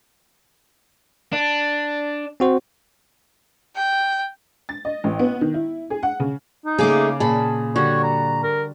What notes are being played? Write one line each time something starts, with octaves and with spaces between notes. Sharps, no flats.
D4
C4 F#4 C5
G5
A6
D#5
A1
B3
D#3
E4
G#4
F#5
C#3
D#4
C#3 A3 A#3 G#4 D6
A#2 G#4 A5 B5
D3 G3 F#4 C#5
A#5
A#4